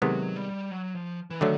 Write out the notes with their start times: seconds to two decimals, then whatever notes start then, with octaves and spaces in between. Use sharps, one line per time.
0.02 C3 D#3 F#3 G#3 B3
0.36 G3
0.71 F#3
0.95 F3
1.30 E3
1.40 D3 D#3 F#3 A3